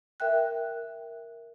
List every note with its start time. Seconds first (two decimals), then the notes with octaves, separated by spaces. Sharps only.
0.20 A#4 E5 G5 F#6